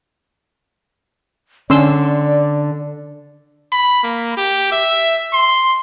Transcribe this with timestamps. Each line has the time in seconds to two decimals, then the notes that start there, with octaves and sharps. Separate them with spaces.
1.70 D3 C#4 D4 D5 C6 E6
3.72 B5
4.03 A#3
4.37 G4
4.72 E5
5.33 C6